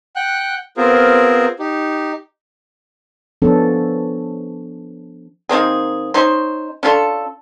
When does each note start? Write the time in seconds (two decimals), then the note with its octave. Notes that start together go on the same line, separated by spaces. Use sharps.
0.16 F#5 G5 F#6
0.77 B3 C4 F4 G#4 A#4 C5
1.59 D#4 G4
3.42 F3 B3 C#4 D4 A4
5.49 D#3 A#3 C4 G#4
6.14 C#4 D#4 C5
6.83 C#4 D4 F4 A4